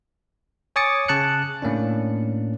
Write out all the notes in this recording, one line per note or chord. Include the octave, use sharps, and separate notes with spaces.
C#5 G#5 D6 D#6 A6 C#7
C#3 A5 F#6 C#7
A2 A#3 C#4 D4